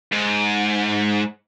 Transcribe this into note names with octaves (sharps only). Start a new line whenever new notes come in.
G#2